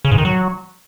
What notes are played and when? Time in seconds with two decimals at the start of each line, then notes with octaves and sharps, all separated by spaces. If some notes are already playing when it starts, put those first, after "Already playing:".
0.05 C#3
0.11 G#2
0.18 D#3
0.25 F#3